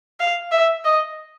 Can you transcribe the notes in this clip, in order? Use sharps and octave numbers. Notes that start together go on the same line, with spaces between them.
F5
E5
D#5